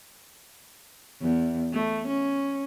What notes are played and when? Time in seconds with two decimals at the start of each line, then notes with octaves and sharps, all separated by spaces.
1.22 E2
1.73 A3
2.07 C#4